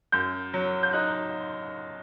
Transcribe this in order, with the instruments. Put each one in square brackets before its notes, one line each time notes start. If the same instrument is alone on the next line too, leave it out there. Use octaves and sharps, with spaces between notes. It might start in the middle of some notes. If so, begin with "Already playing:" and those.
[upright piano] F#2 G6
F#3
G6
D#4 F#6